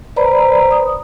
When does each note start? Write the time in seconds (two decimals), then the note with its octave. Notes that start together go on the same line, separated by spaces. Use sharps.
0.16 B4 C5 D5 A#5 B5
0.71 D#6